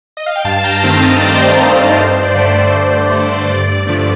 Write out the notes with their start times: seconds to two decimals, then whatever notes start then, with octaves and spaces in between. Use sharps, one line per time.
0.17 D#5
0.26 F5
0.36 G5
0.45 G2 F5 A5
0.64 G5 A#5
0.83 D#3 A3 C4
1.02 D#5 G5
1.21 G2 D5
1.32 C5
1.42 D5
1.59 D#3 A3 C4
1.97 G2 C5
2.23 D5
2.35 D3 A3
2.48 C5
2.59 D5
2.71 G2 C5
3.12 D3 A3
3.49 G2 D5
3.87 D3 F3 A3